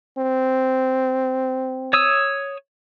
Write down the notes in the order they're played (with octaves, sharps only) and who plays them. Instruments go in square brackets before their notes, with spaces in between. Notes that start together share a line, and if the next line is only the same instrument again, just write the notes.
[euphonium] C4
[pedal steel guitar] C#5 D#6 E6